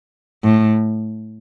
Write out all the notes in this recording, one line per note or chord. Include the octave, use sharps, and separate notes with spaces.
A2